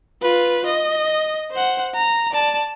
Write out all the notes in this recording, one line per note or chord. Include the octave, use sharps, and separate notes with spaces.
F4 B4
D#5
C5 F#5
A#5
D5 A5